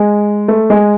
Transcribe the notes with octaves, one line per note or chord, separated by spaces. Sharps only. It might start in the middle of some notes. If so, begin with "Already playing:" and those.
Already playing: G#3
A3
G#3